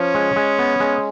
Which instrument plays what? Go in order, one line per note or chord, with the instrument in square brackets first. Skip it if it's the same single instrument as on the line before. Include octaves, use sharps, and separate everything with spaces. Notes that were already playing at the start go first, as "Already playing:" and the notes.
Already playing: [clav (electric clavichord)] F3 [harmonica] C#4
[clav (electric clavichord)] G#3
G#3
B3
G#3